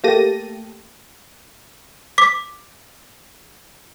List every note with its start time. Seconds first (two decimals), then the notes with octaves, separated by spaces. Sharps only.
0.04 A3 A#3 G4 A5 A#6 D#7
2.18 D6 B6